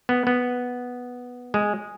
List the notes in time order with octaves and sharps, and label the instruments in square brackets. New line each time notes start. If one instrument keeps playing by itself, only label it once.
[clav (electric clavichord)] B3
B3
G#3